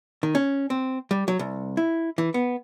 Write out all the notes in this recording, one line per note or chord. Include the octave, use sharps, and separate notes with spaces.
D#3
C#4
C4
G3
F#3
C2
E4
E3
B3